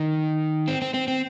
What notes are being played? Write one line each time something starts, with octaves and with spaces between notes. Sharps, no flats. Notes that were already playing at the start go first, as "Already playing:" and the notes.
Already playing: D#3
C4
C4
C4
C4